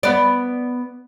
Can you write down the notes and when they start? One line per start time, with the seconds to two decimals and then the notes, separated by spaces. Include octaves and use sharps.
0.03 B3 D5